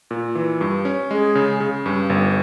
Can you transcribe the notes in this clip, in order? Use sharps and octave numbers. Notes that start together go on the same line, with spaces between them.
A#2
E3
G2
C#4
G#3 G#4
C#3
C#3
G2
G1